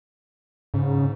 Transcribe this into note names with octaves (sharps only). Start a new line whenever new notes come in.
G#2 C#3